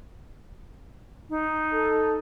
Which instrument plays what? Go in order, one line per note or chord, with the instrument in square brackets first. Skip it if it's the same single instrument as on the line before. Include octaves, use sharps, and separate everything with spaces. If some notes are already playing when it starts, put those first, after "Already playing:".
[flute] D#4
[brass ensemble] A4